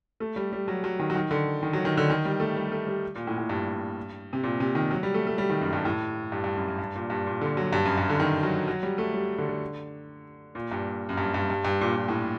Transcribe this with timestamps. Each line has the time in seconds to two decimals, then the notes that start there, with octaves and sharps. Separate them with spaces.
0.20 A3
0.36 G3
0.53 G3
0.68 F#3
0.84 F#3
0.99 D#3
1.10 F#3
1.15 D#3
1.31 D3
1.63 D#3
1.73 F#3
1.85 D#3
1.97 D3
2.10 D#3
2.25 G3
2.40 A3
2.56 G3
2.72 A3
2.87 G3
3.15 A#2
3.27 A2
3.38 A2
3.49 G2
4.33 C3
4.44 A#2
4.60 C3
4.75 D#3
4.91 F#3
5.03 G3
5.14 A3
5.27 A3
5.38 G3
5.49 D#3
5.61 F#2
5.73 G2
5.85 A2
6.32 G2
6.44 G2
6.56 F#2
6.68 F#2
6.79 G2
6.95 A#2
7.10 G2
7.26 A#2
7.41 D3
7.57 F#3
7.73 G2
7.85 F#2
7.97 G2
8.10 D3
8.20 D#3
8.43 F#3
8.68 F#3
8.83 G3
8.98 A3
9.14 G3
9.38 D3
9.49 D3
10.55 A#2
10.72 G2
11.09 F#2
11.18 G2
11.34 G2
11.50 G2
11.65 G2
11.81 A#2
11.96 A#2
12.08 A2